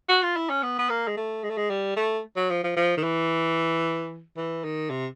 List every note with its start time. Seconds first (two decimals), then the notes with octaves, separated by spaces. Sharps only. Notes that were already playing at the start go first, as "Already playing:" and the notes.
0.09 F#4
0.23 F4
0.36 E4
0.50 C#4
0.63 B3
0.79 B3
0.90 A#3
1.07 G#3
1.17 A3
1.43 G#3
1.50 A3
1.57 G#3
1.70 G3
1.96 A3
2.36 F#3
2.51 F3
2.64 F3
2.76 F3
2.97 D#3
3.03 E3
4.37 E3
4.64 D#3
4.90 C3